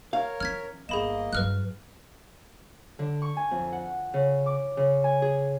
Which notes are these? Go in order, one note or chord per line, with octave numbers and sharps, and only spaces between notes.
A#4 C#5 F5
E3 C#4 F6 G#6 B6
G1 A#3 G#4 D#5 B5 E7
G2 F#3 B4 F6 F#6
D3
C#6
G#5
F2
F#5
C#3
D6
C#3
G#5
G#4